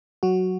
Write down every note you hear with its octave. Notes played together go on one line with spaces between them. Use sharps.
F#3 F#4